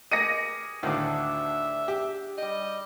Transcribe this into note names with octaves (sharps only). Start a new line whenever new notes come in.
G4 G#4 A#4 D#5 A#6 C#7 D#7
D2 A2 D#3 D4 E5 F5
G4
G3 D#5 G5